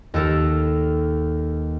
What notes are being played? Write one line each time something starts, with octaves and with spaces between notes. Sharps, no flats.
D#2 A4 A#4